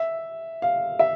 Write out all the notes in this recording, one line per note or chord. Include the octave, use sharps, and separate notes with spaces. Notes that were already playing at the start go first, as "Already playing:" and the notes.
Already playing: E5
F5
E5